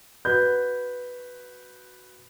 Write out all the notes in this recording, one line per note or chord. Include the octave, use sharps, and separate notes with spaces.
F#4 B4 G6